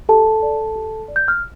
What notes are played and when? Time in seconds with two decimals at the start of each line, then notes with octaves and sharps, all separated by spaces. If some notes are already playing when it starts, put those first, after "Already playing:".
0.09 G4 A4 A5
0.43 D5
0.76 G4
1.08 D5
1.16 G6
1.28 F6